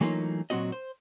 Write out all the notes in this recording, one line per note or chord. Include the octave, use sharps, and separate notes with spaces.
E3 F#3 A3 A#3 D#4 F4
A#2 F#3 A#3 C4 F#4 D#5
C5